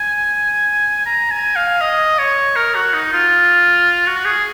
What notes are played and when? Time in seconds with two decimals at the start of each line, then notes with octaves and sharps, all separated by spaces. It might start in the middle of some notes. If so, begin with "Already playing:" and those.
Already playing: G#5
1.06 A#5
1.31 G#5
1.56 F5
1.81 D#5
2.19 C#5
2.56 A#4
2.75 F#4
2.93 D#4
3.13 F4
4.07 F#4
4.25 G#4